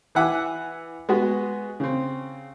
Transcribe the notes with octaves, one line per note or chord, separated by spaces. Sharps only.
E3 E5 F#5 G#5 D6
G#3 B3 F#4
C#3 C4